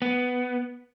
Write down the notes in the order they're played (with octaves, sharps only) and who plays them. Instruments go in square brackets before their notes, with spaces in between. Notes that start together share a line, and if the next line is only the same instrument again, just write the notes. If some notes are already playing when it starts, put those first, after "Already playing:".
[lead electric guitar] B3